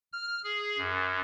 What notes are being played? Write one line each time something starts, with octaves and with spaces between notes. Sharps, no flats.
F6
G#4
F#2